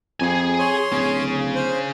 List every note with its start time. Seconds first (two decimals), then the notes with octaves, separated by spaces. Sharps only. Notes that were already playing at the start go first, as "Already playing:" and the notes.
0.20 F2 G#4 G#5
0.59 C#5 C6
0.92 D1 C#4 G#4
1.55 C5